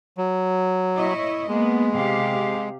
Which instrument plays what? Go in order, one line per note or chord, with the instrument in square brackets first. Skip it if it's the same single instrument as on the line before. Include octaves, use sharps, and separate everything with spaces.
[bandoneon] F#3
[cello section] E4 C#5 D#5
[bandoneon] G#3 [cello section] A#3 B3
[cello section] C3 G4 F5